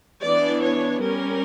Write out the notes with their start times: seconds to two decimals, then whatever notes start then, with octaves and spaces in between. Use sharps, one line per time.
0.24 E3 B3 D4 D5
0.63 C#5
1.03 G3 C#4 A#4